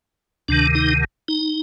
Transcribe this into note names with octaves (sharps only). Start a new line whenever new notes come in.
D2 C3 D#3 D4
D#4
D#4